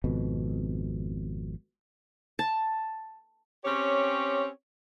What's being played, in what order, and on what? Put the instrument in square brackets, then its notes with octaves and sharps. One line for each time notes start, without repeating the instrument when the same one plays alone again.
[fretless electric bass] G#1 F2 B2
[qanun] A5
[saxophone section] C4 C#4 G4 C#5